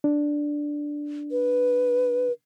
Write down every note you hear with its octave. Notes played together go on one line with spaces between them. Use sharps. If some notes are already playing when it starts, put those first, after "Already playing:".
D4
B4